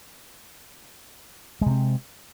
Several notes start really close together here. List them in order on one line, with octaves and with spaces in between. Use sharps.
G#3 C3 C4